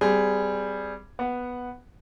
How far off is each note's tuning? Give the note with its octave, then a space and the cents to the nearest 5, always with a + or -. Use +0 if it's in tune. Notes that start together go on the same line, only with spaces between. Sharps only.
G3 +0 C4 -30 G#4 +0
B3 +0 F#5 +0